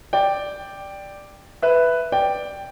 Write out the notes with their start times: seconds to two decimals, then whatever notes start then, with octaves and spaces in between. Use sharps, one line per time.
0.13 D5 G5
1.62 B4 E5
2.12 D5 G5